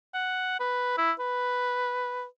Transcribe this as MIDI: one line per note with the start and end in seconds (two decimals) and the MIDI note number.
0.14 0.56 78
0.60 0.93 71
0.97 1.12 64
1.19 2.24 71